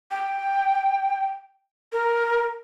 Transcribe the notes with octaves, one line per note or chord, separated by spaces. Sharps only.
G5
A#4